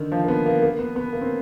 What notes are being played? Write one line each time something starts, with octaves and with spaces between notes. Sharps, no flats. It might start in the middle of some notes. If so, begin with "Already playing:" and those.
Already playing: D3 D#3
F3
A#3
B3
A#3
A#3
B3
B3
A#3
C4